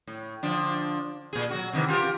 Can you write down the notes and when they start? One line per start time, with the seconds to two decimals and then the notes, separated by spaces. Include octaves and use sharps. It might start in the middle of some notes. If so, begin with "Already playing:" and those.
0.07 A2
0.43 D3 F3 D4
1.33 A#2 G#4
1.50 F#3 F#4
1.73 C3 D#3 E3
1.88 F4 G4 A#4